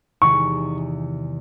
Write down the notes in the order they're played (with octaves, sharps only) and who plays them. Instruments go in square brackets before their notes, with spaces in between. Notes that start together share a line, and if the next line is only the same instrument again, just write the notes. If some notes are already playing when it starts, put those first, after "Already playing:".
[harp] E2 C3 D#3 G#3 [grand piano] C#6